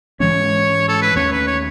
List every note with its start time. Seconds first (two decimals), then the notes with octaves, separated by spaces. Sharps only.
0.20 G#2 E3 G#3 C#4 C#5
0.88 A4
1.02 B4
1.15 D#2 D#3 A3 C#4 C#5
1.32 B4
1.47 C#5